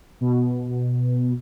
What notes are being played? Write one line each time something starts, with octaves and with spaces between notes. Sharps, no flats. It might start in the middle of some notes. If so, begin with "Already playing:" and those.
B2